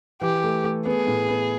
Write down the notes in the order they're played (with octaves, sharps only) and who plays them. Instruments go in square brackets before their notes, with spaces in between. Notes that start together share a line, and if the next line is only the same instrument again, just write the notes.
[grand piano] E3 [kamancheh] G4
[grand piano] A3
A3
[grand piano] B3 [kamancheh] G#4
[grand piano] A2
B3